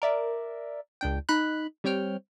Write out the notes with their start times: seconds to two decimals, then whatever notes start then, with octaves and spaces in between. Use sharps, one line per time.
0.02 A#4 D5 E5
1.01 C#2 D4 G5
1.29 D#4 B5 F#6
1.84 G3 C4 C#5 G5 F6